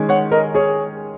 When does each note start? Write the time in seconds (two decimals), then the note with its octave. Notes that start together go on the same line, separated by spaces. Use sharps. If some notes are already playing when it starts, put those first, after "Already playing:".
Already playing: D#3 G#3 C#4
0.09 C#5 F#5
0.31 A#4 D#5
0.54 G#4 C#5